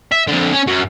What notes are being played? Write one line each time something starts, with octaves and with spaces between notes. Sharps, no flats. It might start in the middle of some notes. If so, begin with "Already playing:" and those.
E5
F2 D3
C#4
F#2 F#3